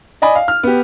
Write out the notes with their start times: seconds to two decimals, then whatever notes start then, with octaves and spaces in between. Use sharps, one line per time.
0.22 D5 D#5 G#5 B5
0.35 F5
0.48 F6
0.63 B3 G4